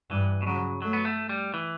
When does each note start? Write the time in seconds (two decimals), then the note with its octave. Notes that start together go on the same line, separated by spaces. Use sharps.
0.11 G2 E3
0.42 B2
0.46 C#3 F#3
0.82 F#3 A3
0.93 B3
1.05 A3
1.29 G3
1.54 E3